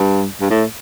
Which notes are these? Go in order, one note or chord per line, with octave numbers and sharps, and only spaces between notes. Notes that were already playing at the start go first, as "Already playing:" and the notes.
Already playing: G2
G2
A2